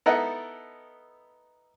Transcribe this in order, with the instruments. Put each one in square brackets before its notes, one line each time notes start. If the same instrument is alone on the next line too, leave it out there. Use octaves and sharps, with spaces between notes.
[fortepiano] B3 D#4 E4 A4 A#4 F#5